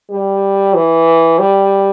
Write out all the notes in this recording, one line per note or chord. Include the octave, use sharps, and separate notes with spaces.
G3
E3
G3